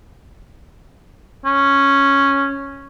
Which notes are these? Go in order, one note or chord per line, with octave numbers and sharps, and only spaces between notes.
C#4